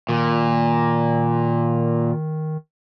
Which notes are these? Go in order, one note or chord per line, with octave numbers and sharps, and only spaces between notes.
A#2 D#3